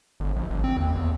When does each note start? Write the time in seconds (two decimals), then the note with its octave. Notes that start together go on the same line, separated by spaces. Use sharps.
0.20 G1
0.36 A#1
0.50 G1
0.64 C4
0.77 D#2
0.95 E2